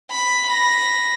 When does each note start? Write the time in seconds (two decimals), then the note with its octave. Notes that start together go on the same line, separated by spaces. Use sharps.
0.11 B5
0.47 B5 A#6